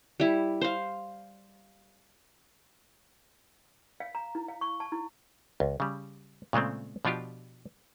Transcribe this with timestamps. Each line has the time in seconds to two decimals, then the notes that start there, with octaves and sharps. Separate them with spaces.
0.20 G3 E4
0.61 C5 F5
4.00 F5
4.15 A#5
4.35 E4
4.48 F5
4.61 C#6
4.80 A5
4.92 E4
5.60 C#2
5.80 C#3 G3
6.53 A#2 C#3 G#3 A3 C4
7.05 B2 F3 D4 F4 G4